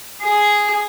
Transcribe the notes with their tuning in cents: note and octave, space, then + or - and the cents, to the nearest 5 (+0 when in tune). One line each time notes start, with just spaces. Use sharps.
G#4 +0